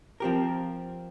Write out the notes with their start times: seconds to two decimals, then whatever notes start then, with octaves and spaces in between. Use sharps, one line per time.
0.20 F3 C4 G4 A#4